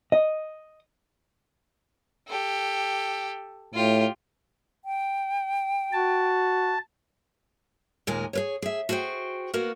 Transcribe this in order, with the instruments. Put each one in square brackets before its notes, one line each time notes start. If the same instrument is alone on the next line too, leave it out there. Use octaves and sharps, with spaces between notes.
[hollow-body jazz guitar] D#5
[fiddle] G4 A4
[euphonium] A2 [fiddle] F4 G4
[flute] G5
[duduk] F#4 [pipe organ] A5
[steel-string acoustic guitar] D#2 A#2 G#3 A#4 G#5
G#4 B4 C#5
G#4 E5
F#4 G#4 C5 D#5 G5
A#3 B3 F#4 A#4